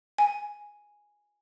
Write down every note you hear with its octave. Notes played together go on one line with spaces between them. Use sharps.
G#5